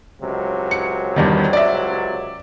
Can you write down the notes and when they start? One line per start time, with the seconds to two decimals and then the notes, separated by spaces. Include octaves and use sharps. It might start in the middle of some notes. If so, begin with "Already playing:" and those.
0.21 C#2 C3 F#3
0.71 C#7
1.16 E2 G2 D#3
1.53 D5 E5